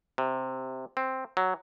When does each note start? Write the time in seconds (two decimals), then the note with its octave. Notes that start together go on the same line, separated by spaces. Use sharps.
0.18 C3
0.97 C4
1.37 F#3